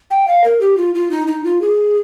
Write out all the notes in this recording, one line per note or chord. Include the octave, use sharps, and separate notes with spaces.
G5
F5
A#4
G4
F4
F4
D#4
D#4
F4
G#4